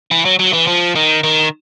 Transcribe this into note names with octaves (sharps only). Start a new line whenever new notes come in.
E3
F#3
F#3
E3
F3
D#3
D#3